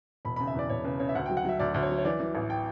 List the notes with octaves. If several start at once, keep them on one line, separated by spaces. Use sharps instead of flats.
E1 B5
C#3 B5
E5
E2 D5
E1 C#5
C#3 B4
C#3 C#5
E5
D2 F#5
F#3 G5
F#5
F#3 E5
D2 D5
D2
C#5
F#3
C#5
E3 D5
E3
A1
G5